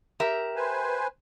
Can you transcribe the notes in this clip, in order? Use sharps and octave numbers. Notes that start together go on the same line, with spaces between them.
G4 A#4 E5
B4 C5 G#5